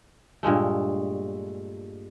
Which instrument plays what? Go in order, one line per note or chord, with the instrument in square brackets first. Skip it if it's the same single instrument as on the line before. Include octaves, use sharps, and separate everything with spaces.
[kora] G2 A#2 G#3 A3